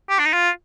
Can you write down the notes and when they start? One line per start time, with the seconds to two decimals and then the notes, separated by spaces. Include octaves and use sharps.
0.10 G4
0.19 D4
0.26 D#4
0.33 F4